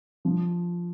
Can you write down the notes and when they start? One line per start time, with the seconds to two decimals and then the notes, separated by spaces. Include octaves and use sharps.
0.25 F3